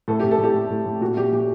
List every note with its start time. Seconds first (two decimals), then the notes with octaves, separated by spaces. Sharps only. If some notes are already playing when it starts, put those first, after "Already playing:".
0.08 A2 A4
0.20 G4
0.24 A2
0.31 A4
0.38 A2
0.44 G4
0.54 A2
0.70 A2
0.86 A2
1.01 A#2 F#4
1.17 A#2 G4
1.32 A#2 G4